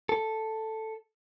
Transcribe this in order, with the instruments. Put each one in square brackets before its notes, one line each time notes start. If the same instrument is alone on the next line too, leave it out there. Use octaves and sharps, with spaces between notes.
[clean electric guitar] A4